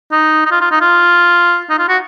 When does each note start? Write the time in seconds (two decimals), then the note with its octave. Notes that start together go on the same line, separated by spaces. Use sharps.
0.12 D#4
0.46 D#4
0.51 F4
0.61 F4
0.71 D#4
0.81 F4
1.69 D#4
1.78 F4
1.88 F#4